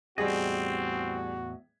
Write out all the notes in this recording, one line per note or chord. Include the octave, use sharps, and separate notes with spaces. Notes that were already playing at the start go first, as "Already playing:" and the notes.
E2 A2 G3 C4 F#4 G#4 D#5